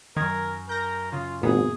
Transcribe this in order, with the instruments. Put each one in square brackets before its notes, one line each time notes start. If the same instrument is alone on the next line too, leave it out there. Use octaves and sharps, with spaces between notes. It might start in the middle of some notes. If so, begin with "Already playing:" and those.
[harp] F#2 G#6 [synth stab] D#3 [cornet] A#4
[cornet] A#4 [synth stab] G6 A#6
[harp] C#3 [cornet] F4
[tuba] G#1 [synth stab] A#2 B3 [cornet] G#4